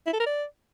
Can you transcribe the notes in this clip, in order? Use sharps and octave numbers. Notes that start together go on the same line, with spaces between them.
E4
A4
A#4
D5